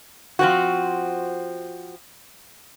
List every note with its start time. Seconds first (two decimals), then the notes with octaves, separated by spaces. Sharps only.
0.39 F3 C4 F#4